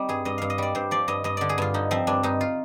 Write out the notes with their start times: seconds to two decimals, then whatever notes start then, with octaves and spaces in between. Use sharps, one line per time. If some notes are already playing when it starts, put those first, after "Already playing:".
Already playing: G3 C4 D#4
0.09 G2 G#4
0.25 G2 D#5
0.38 G2 F5
0.50 D#5
0.58 G3 D5
0.75 G2 C5
0.91 F3 D5
1.08 G2 D#5
1.24 G2 D#5
1.37 D3 D5
1.49 G#4
1.58 G2 F4
1.74 D3 D#4
1.91 F3 C4
2.07 G2 D4
2.23 G2 D#4
2.41 F4